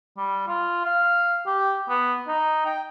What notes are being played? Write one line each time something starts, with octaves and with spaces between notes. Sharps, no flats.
G3
F4
F5
G4
B3
D#4
G5